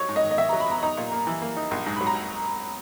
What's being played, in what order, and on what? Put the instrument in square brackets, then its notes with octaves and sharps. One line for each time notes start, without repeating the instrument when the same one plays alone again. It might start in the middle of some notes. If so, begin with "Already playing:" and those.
Already playing: [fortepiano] F#3 D#4 [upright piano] C#5
[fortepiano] G#2
[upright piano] D#5
[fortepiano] D#3
[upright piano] D#5
[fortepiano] D#3 [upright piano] E5
[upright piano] A#5
[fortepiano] F#3
[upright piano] B5
[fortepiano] B3 [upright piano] A#5
[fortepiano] D#4 [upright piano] A#5
[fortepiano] A#2
A#3
E3
A#3
D#4
A#1
G#2
[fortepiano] F#3 [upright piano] B5
[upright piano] A#5